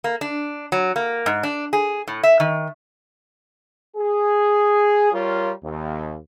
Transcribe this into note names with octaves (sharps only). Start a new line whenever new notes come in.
A#3
D4
F#3
A#3
G#2
D4
G#4
A2
E5
D#3
G#4
G3 F4 A#4 C#5
D#2